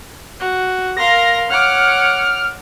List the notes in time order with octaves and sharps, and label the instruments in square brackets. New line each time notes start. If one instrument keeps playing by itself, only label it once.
[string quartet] F#4
[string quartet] A#4 F5 C6 [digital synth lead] A#6
[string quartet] C#5 F#5 D6 [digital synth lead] F6